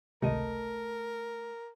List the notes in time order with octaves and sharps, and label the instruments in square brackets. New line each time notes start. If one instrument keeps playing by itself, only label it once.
[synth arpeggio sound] G#1 C#2 C3 [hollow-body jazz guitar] A3 D#5 [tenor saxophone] A#4